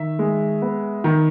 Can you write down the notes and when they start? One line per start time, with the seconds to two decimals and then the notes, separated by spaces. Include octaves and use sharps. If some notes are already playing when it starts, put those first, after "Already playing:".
Already playing: D#3 E5
0.19 G#3
0.62 B3
1.04 D#3